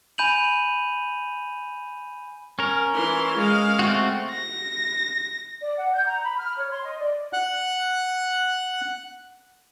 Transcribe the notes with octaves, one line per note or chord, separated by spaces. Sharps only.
G#5 B5 G6 D#7 F7 F#7
C#4 A#4
E3 C6
G#3 F5
A3 C4 F#4
A#6
D5
F#5
G6
A#5
B5
F6
C#5
C6
D#5
D5
F#5 F#6